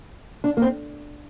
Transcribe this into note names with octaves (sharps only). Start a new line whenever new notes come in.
D4
A#3
C4